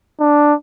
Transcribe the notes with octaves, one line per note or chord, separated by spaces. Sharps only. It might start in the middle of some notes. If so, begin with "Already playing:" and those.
D4